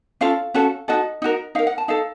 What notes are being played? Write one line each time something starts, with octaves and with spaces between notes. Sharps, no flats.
C#4 F4 A4 F5
C#4 F#4 A4
D#4 F#4 A4 D#5
D#4 F#4 A#4
D#4 A#4 F5
F#5
A5
D#4 A4 F5